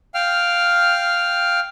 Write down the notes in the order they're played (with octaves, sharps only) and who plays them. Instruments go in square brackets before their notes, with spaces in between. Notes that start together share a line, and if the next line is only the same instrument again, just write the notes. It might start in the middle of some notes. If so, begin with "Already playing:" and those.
[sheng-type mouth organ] F5 G5 F6